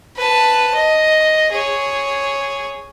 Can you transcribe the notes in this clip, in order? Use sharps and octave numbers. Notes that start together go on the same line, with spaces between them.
B4 A5
D#5
G#4 C#5